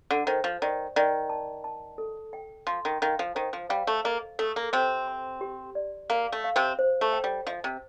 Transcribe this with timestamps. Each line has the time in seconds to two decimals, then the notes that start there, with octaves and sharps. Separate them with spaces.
0.11 D3
0.27 D#3 C5
0.44 F3
0.62 D#3 D5
0.96 D#3 D5
1.30 A5
1.64 A5
1.98 A4
2.33 G5
2.67 F3 C6
2.85 D#3
3.02 D#3 F5
3.19 F3
3.35 D#3 C5
3.53 F3
3.69 G3 F5
3.87 A3
4.04 A#3 D#5
4.39 A3 A4
4.56 A#3
4.73 C3 C4 C5
5.08 C6
5.41 G4
5.75 D5
6.10 A#3 F5
6.32 A3
6.44 F5
6.56 C3 C4
6.79 C5
7.01 A3
7.12 G5
7.24 G3
7.47 F3 D#5
7.64 C3